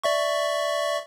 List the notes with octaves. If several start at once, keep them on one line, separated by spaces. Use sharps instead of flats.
D5 E5 C#6